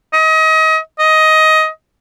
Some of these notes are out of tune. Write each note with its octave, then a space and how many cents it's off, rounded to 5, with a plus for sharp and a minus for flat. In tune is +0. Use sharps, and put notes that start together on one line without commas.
D#5 +30
D#5 +15